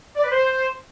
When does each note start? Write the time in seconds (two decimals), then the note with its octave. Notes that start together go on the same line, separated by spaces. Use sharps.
0.16 D5
0.24 B4
0.32 C5